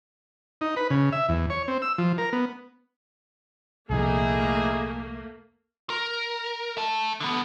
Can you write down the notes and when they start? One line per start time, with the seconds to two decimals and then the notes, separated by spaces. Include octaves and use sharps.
0.61 D#4
0.76 B4
0.90 C#3
1.12 E5
1.29 E2
1.50 C#5
1.68 C4
1.82 E6
1.98 F3
2.18 A#4
2.33 B3
3.90 C2 F2 A#2 A3 A#3 D#4 E4 G#4
5.90 A#4
6.77 E5 A5
7.20 D3 B3